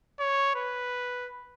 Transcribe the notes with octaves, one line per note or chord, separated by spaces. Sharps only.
C#5
B4